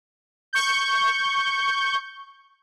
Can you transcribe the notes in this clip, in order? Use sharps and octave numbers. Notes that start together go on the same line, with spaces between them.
C#6 G6